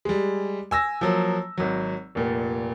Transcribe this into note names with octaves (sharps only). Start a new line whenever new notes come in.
G3 G#3
G#5 E6 A#6
F3 F#3 A#3
G#1 F#3
F1 A#2